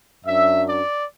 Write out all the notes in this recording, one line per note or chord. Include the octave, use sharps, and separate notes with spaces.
F#2 F#3 D4 E5
D5